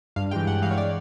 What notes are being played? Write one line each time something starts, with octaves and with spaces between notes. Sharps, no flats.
G2 F5
E3 G#3 G5
G2 F#5
E3 G#3 F5
C#5
D5